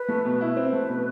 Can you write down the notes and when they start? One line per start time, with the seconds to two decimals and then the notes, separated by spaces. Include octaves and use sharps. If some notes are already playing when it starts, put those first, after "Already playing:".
Already playing: B4
0.09 A3
0.25 B2
0.41 E4
0.56 C4 B4
0.73 A3
0.89 B2